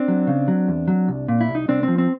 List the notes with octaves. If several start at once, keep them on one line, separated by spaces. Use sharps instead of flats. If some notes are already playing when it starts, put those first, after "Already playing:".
Already playing: C4 D4
F#3
C#3
F#3
E2
F#3
C2
A#2
E4
C2
D#4
C2 C4 D4
F3 C4
C4